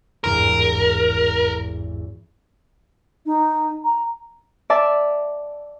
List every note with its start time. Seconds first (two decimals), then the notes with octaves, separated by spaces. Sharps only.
0.24 G#1 E2 G2 A#4
3.26 D#4
3.84 A#5
4.70 D5 E5 A5